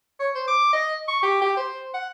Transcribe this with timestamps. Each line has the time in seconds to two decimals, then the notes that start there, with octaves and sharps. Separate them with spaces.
0.20 C#5
0.35 C5
0.47 D6
0.73 D#5
1.08 C#6
1.23 G4
1.42 G4
1.57 C5
1.94 F#5